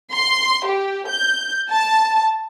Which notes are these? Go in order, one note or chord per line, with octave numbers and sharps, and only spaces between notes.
C6
G4
G6
A5